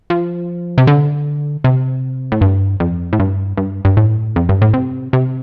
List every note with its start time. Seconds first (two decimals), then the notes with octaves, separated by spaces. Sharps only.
0.10 F3
0.78 C3
0.87 D3
1.64 C3
2.32 A2
2.41 G2
2.80 F2
3.13 A2
3.20 G2
3.57 G2
3.85 G2
3.97 A2
4.36 F2
4.49 G2
4.62 A2
4.74 C3
5.13 C3